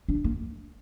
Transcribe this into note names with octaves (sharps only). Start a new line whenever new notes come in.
D4
A#3